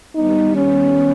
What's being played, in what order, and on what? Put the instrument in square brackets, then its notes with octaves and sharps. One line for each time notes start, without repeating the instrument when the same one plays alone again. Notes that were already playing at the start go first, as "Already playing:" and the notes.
[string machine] D#3 G3 B3 [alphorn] D#4
[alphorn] C#4